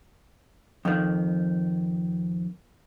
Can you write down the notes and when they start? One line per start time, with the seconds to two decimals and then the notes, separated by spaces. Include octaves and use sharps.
0.85 F2 D#3